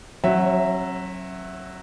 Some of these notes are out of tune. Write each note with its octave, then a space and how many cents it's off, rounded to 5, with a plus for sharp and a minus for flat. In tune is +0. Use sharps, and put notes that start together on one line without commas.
F#3 +0 C#4 -45 E5 +0